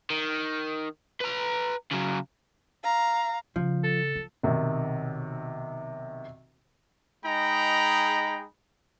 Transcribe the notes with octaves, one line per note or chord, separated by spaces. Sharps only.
D#3
B4 A#5
C#3 F#3
F5 A#5
C#3 F3
A4
F3
B1 C3 D#3
G#3 D#4 G#4 G5 A#5 B5